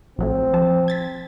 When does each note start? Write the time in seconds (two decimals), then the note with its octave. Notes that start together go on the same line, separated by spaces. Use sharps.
0.18 A#1 F#3 A3 C4
0.53 F3 A5
0.88 G#6 A6 B6